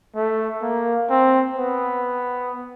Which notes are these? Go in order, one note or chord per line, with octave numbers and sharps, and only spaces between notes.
A3
A#3
C4
B3